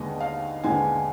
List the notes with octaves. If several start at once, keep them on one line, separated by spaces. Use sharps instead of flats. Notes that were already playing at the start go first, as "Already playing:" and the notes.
Already playing: D#2 D3 G#3 B3 D#5
F5
D#2 D3 G#3 B3 G#5